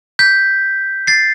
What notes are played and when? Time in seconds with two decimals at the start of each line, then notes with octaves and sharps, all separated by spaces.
0.19 G6 B6
1.07 A6 C7